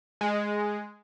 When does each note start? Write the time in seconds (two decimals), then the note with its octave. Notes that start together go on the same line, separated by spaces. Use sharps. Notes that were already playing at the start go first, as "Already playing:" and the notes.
0.21 G#3